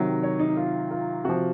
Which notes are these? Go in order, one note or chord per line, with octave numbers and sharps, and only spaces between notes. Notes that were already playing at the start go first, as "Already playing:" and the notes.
Already playing: C3 D#3 F#3
C#5
D#4
F4
F4
C3 F3 F#4